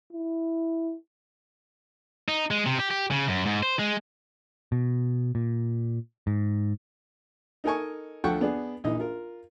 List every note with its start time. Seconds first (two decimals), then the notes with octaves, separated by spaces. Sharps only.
0.12 E4
2.28 D#4
2.51 G#3
2.66 C3
2.79 G4
2.91 G4
3.11 C#3
3.28 F#2
3.46 G#2
3.63 C5
3.79 G#3
4.72 B2
5.35 A#2
6.27 G#2
7.64 D#4 A4 A#4 D#5 G#5 C#6
8.24 D2 F3 A4 F#5 G5 C#6
8.41 B3 D4 G#4
8.84 A#1 E3 D#4 D#5
8.99 F4 A#4